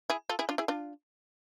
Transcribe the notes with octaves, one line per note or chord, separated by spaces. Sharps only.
E4 G#4
F4 A4
E4 G#4
D4 F4
E4 G#4
D4 F4